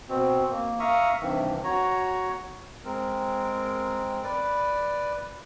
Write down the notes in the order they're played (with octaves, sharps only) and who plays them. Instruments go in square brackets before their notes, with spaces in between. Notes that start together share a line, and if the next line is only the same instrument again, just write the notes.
[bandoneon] B2 C4
A#3
E5 F5 A#5 C#6 D#6
G2 C3 D#3 E3
F#4 C#5 A#5
[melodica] G#3 C4 A#4
B4 D5